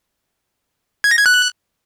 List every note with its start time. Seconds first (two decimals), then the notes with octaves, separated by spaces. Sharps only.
1.04 G#6
1.11 A#6
1.18 G#6
1.26 F#6